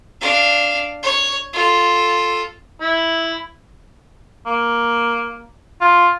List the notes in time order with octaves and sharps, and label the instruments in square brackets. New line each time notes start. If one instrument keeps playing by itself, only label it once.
[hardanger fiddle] D4 F5
C#5
F4 A4
[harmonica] E4
[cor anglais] A#3
F4